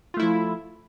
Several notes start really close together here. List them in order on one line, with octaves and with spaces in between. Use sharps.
F4 A3 E4 F3